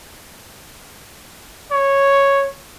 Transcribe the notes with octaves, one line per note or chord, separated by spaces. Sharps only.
C#5